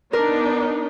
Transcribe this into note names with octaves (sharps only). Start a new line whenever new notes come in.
B3 D4 D#4 A#4